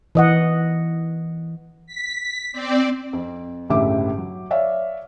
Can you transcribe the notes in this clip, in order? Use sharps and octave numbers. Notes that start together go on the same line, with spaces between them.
E3 D#5 F#5
B6
C4 D5
F2
G1 C#2 A2 G4 E5 D6
F#3
C#5 D5 E5 F5